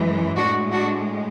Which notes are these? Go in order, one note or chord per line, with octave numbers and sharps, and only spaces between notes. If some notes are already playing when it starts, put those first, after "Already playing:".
Already playing: F#2 E3 G#3
A2 G#3 D4 F#4
D4 F#4